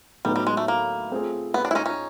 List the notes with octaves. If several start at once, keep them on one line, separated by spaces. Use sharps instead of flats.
A2 F#3 G3 B3 D#4
G3
G#3
A3
A#3
A3 C4 F4 G#4
B3
D4
E4
C#4 D#4
C#4 D#4